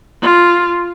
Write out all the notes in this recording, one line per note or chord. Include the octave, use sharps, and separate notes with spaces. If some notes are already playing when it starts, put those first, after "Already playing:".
F4